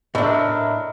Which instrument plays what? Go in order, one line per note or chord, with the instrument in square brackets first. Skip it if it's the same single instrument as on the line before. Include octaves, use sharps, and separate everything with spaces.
[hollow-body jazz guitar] A2 D4 [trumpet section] A#4 E5 [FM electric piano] D#5